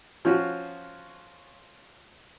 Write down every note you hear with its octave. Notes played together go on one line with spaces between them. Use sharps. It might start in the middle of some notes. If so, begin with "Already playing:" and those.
F3 C#4 F4 F#4